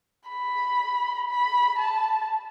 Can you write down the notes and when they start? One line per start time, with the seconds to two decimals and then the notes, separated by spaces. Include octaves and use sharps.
0.29 B5
1.29 B5
1.79 A5